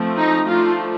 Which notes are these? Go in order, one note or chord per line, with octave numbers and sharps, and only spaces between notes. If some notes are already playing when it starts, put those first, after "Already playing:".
Already playing: F3 A3 C4
D#4
F3 A3 D4 F4